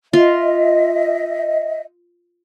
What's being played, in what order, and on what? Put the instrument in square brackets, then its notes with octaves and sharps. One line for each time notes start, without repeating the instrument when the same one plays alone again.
[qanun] F4 [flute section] D#5 E5